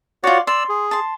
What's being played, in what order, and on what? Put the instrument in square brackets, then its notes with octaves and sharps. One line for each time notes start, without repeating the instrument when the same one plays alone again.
[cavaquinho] F4 D5 [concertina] F#4 C#5 F#5
[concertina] D5 E6 [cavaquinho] C6
[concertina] G#4
[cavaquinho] A5 C6